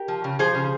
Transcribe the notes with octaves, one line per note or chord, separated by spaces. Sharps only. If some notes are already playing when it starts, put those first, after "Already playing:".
Already playing: G4 A#4
F3
C#3
F3 G#4 C5
C#3